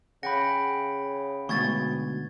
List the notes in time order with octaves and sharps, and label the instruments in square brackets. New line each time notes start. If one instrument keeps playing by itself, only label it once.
[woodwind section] C#3 [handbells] F#5 G5 B5 [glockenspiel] A#6
[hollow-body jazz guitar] D2 G#2 B2 [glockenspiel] C#6 G#6 A6